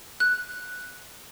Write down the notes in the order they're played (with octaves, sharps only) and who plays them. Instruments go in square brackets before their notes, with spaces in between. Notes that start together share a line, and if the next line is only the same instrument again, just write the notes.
[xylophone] F#6